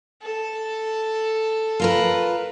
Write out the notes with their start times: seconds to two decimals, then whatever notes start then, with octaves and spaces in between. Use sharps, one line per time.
0.23 A4
1.80 F4 A#4 B4